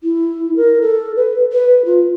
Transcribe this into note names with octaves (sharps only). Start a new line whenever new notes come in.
E4
A#4
A4
B4
B4
F4